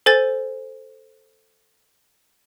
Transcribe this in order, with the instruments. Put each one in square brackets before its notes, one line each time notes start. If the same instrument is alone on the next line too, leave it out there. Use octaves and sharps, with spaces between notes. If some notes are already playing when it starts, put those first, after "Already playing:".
[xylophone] A4 C5 G#5 A6